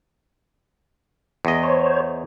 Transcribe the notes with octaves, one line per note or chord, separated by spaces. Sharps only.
E2 D#5
C5 C#5